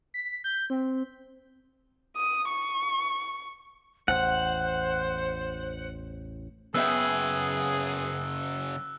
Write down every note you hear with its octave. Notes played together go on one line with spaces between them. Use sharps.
B6
G6
C4
D#6
C#6
A1 E2 C5 F#5
F#2 C#3 B3 G#4 E5 G5 E6 F#6